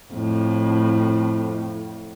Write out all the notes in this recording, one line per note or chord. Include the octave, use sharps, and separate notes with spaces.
F2 A2